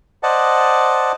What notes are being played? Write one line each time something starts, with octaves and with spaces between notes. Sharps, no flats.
C5 D5 D#5 F#5 A5